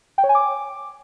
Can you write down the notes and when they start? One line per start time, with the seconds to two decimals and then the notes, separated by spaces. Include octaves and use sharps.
0.18 G5
0.24 C#5
0.29 G#5
0.35 D6